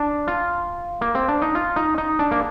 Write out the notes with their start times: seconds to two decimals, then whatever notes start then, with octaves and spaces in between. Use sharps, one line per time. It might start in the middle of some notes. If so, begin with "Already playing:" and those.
Already playing: D4
0.28 F4
1.01 A#3
1.15 C4
1.28 D4
1.42 D#4
1.55 F4
1.76 D#4
1.98 D#4
2.19 D4
2.31 A#3